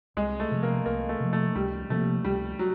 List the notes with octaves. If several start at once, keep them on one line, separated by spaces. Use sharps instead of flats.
C2 G#3
A3
C3 F3
A#3
C2 A#3
A3
C3 F3
A3
C#2 G3
C3 F3 A3 A#3
C#2 G3
F#3